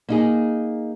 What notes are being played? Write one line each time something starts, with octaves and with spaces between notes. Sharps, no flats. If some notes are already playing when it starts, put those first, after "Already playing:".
A#3 D#4 G#4